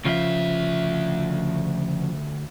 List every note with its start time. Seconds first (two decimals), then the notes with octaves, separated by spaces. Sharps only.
0.05 D2 C#3 F3 E5